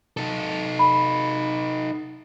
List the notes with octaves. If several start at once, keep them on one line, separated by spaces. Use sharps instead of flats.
D#4 A4
B5